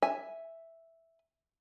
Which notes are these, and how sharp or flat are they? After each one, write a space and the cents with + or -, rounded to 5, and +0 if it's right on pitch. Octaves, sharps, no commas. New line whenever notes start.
E5 +0 G#5 +0